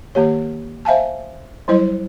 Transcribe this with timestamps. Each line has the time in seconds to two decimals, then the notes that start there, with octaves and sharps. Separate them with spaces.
0.15 D#3 A#3 G4 C#5
0.85 C5 E5 F5 G#5 A5
1.68 F#3 G3 E4 C5 D#5